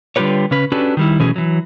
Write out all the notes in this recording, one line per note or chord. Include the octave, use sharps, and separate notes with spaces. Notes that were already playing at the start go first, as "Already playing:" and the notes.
D3 G3 F4 G4 B4 C#5
C#3 C#4 B4
C#4 D4 F#4 G4 A4 B4
D#3 G3 E4
B2 E3 F#3 A3 C#4 G#4
E3 F#3